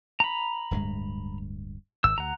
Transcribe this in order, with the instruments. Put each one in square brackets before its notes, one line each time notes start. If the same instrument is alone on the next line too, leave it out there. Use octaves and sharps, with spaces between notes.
[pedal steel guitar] A#5 B5
[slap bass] D1 G2 G#3
[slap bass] G#1 [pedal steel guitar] E6
[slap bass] D2 [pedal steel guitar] F#5 A#5